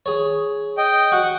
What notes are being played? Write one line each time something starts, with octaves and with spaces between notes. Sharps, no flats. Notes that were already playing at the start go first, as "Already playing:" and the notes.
G#4 C#5
D#5 G5
F#4 F#5